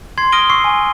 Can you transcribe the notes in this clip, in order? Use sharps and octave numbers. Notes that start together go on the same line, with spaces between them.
C6 G#6 C7
D#6 F6 A#6 D7 D#7 G7
C#6 E6 C7
G#5